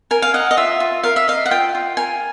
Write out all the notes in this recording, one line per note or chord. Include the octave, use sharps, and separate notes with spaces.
A#4 G#5
F5
D#5 F#5
D#5
F4 E5
F4
A#4 F5
E5
D#5 F5
F#5
F4 G5
F4
A#4 G#5